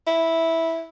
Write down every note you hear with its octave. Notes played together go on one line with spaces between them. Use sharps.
E4